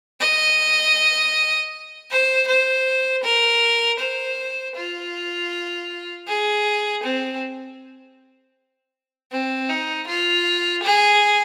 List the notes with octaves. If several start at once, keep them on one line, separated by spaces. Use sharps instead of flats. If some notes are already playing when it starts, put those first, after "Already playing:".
D#5
C5
C5
A#4
C5
F4
G#4
C4
C4
D#4
F4
G#4